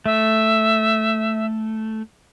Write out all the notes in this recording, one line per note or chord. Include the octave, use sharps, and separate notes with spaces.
A3 E5